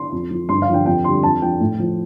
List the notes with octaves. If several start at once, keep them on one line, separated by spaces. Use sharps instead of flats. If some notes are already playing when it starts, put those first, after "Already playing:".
Already playing: C6
F2
F3
G2 C6
F5
D3 F3
G5
F2 G5
D3 G3 C6
F2 A5
F3 G5
A2
F3